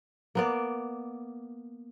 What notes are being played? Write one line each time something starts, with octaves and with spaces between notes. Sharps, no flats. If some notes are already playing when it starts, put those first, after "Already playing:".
A#3 B3 D5